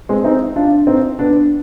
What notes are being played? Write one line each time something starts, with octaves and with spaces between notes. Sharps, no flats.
G#3 C4
C4 D#4
D4 F4
C4 D#4
B3 D4